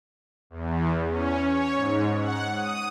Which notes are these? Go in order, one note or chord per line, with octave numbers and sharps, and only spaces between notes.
E2
C#4
C#5
G#2
F#5
D#6